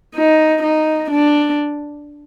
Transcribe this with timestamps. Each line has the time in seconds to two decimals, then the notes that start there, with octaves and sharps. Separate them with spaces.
0.15 D#4
0.63 D#4
1.11 D4